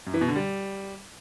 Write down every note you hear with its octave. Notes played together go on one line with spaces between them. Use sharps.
F#2
E3
B2
D3
G3